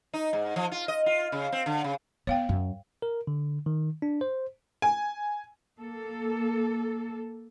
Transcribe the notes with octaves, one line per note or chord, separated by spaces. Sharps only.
D#4
G#2
F3
F4
D#5
F4
C#3
C4
D3
C#3
B3 C#5 F5 G5
F#2
A#4
D3
D#3
D4
C5
G#5
A#3 A4